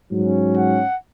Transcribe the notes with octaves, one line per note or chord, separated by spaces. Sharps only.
G#2 F#3 C#4
F#5